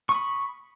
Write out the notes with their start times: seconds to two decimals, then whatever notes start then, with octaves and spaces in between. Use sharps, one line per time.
0.09 C#6
0.12 D#6
0.14 B5